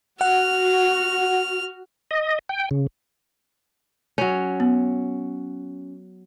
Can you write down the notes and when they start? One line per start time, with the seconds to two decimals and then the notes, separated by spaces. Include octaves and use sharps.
0.21 F#4 F#5 F6
2.11 D#5
2.49 G5
2.71 C#3
4.18 F#3 C#4
4.60 B3